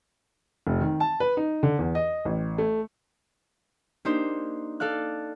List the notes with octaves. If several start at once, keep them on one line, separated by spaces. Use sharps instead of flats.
F1
D#3
A5
B4
D#4
D3
E2
D#5
A1
A3
A#3 D4 D#4 G4 C5
A4 D5 F5 F#6